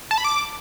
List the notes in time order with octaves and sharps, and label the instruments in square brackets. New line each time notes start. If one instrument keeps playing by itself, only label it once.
[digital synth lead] A5
B5
D6